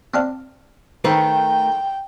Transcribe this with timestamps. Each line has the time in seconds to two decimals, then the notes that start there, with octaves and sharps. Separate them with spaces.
0.14 C4 D4 F5
1.04 D#3 A3 B4 C5 G5